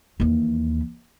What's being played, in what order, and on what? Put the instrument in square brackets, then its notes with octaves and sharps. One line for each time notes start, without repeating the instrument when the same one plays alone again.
[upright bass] D#2 E3